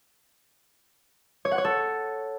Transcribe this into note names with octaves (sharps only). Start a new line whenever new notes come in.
C#5
F#5
C#5
A4